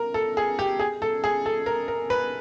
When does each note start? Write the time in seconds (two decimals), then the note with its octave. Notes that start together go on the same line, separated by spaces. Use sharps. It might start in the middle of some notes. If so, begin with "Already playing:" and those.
Already playing: A#4
0.14 A4
0.37 G#4
0.59 G4
0.79 G#4
1.02 A4
1.24 G#4
1.46 A4
1.66 A#4
1.88 A#4
2.10 B4